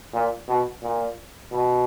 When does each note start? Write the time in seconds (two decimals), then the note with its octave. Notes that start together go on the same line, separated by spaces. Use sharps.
0.13 A#2
0.48 B2
0.82 A#2
1.52 B2